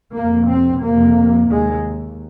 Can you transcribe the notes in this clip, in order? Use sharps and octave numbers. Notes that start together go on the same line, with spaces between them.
F2 C3 A#3
C4
F2 C3 A#3
D#2 G#3